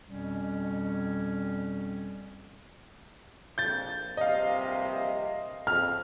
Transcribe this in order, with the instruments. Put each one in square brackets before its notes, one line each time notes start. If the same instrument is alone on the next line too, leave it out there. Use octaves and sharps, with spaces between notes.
[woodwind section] F2 B2 G3 C#4
[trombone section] A#1 F2 [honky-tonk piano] G6 A6
[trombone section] A#1 G2 C3 [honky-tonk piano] D#5 F5
[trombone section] F2 C#3 [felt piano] F6